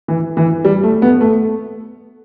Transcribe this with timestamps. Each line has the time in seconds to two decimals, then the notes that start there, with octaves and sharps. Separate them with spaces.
0.08 E3
0.37 E3
0.65 G3
0.84 A3
1.02 B3
1.21 A3